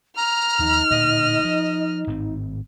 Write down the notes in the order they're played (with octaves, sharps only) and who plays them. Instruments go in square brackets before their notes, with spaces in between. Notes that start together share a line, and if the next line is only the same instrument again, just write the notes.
[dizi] A#5 [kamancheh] F6
[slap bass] D#2 F3 [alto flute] D#4
[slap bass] D1 D2 A#2 [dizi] D#5
[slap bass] F3
G#1 A2 C4